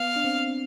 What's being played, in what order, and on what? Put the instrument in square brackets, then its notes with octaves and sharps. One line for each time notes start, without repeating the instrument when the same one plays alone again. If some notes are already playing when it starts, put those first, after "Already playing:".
Already playing: [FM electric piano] B3 [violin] F5
[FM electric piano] D4
C4